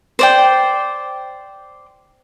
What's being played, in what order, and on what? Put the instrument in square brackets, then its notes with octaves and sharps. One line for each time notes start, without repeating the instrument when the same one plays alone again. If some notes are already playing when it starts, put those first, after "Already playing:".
[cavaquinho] C5 D5 G5